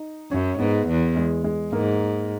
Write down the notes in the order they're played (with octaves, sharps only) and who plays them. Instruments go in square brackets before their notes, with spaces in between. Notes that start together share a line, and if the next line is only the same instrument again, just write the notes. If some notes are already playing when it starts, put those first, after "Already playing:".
Already playing: [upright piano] D#4
[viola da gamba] F#2 [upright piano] C#4
[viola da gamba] G#2 [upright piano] B3
[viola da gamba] E2
[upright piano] G#3
G#3
[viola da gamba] G#2 [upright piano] A#3